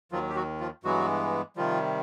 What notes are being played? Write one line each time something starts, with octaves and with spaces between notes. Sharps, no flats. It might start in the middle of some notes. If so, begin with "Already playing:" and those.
D#2 D#3 F3 F#3 F4
G4
F#3 F#4
F3 F4
G2 E3 F#3 G#3 B3 F#4
C3 D#3 F3 G3 F4